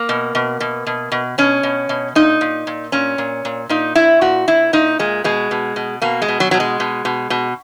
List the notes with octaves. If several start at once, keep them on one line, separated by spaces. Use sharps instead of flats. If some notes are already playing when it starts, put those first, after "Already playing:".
Already playing: A#3
B2
B2
B2
B2
B2
B2 C#4
B2
B2
A#2 D#4
A#2
A#2
A#2 C#4
A#2
A#2
A#2 D#4
A#2 E4
A#2 F#4
A#2 E4
A#2 D#4
A#2 G#3
B2 G#3
B2
B2
B2 A#3
G#3
B2
F#3
B2 F#3
G#3
B2
B2
B2